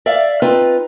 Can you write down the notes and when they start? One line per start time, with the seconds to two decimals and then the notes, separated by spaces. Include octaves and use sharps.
0.06 D5 E5 F5
0.42 C4 D#4 F4 B4